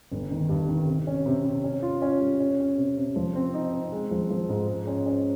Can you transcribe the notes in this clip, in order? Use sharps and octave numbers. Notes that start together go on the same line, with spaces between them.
G1
D#3
G2
D#3
C3
C#4
C3
C3
C#4
F4
C#4
G3
C#4
C#4
C3
C3
F3
C4
D#4
C4
G#3
F3
F3
G#2
G#3
C#4
C#4